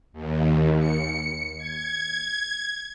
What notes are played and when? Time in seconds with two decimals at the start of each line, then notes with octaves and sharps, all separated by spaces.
0.13 D#2
0.79 C#7
1.58 G#6